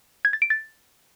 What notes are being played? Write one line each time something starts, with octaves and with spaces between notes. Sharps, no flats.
G#6
A6
D7
A6